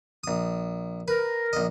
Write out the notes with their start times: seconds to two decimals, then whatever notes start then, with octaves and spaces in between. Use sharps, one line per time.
0.24 A#1 D#6
1.08 A#4 B4
1.53 A#1 D#5